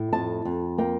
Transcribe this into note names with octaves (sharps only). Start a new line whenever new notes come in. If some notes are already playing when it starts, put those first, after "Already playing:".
Already playing: A2
F2 A5
F2
A#3 G5